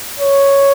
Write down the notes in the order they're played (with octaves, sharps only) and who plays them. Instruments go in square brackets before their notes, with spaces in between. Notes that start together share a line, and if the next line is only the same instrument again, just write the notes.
[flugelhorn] C#5